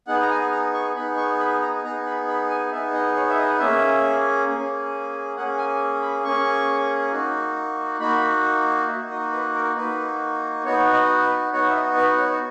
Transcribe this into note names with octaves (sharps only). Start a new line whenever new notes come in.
B3 D#4 G#4 F#5
A#5
G#5
A#5
C#6
B3 D#4 G#4 B5
C#6
B5
A#5
B3 D#4 G#4 A#5
B5
B5
G#5
B3 D#4 G#4 E5
D#5
C#5
E5
D#5
A#3 C#4 G#4 E5
A#3 C#4 G#4
A#3 C#4 G#4 F#5
G#5
B5
A#3 C#4 G#4 C#6
A#3 D#4 F#4
A#3 D#4 F#4 B5
A#3 D#4 F#4 E5
D#5
B4
A#4
A#3 D#4 F#4 B4
B3 D#4 F#4 C#5
D#5
B4
B3 D#4 F#4 C#5
E5
D#5
B4
C#5